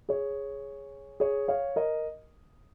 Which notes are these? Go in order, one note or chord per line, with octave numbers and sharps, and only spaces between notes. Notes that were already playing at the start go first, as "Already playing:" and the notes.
G#4 C#5
G#4 C#5
C#5 F5
A#4 D#5